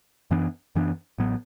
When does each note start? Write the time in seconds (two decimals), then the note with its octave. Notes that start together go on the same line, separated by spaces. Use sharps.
0.31 F#2 E3 B3 D4
0.75 F#2 E3 B3 D4
1.18 A1 A2 F#3 B3